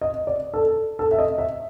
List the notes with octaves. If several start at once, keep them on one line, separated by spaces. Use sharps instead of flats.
D#5
D5
A4
A4
E5
D#5
E5